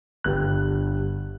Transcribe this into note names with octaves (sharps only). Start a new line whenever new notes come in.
G1 G2 D3 G3 F#6